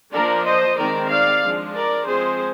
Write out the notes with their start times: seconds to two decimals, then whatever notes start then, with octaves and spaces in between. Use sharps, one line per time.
0.12 F3 A#3 D4 A#4 D5
0.45 C5 D#5
0.78 D#3 G#3 C4 A#4 D5
1.10 D5 F5
1.42 F3 G#3 D4
1.75 A#4 D5
2.07 F3 G#3 C4 G#4 C5